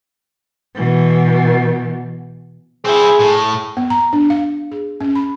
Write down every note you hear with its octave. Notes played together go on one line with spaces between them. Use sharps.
B2 E3
C4 E4 G#4
A2
B3
A#5
D4
F5
G#4
C#4
B5